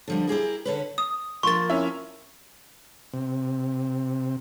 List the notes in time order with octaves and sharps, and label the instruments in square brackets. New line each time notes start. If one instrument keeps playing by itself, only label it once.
[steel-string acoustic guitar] D3 F3 G3
E4 G4 G#4 A#4
D3 C#4 B4
[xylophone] D#6
[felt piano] F3 A#3 [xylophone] C6 A6 [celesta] C#6
[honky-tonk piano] C#4 E4
[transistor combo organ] C3